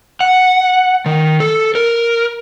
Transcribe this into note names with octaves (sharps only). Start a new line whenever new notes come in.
F#5
D#3
A4
A#4